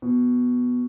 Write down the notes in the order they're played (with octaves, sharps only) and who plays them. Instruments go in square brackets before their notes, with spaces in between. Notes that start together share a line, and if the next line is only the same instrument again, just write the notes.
[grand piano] B2